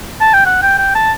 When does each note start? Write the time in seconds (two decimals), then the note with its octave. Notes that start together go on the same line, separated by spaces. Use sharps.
0.21 A5
0.34 G5
0.46 F#5
0.62 G5
0.78 G5
0.95 A5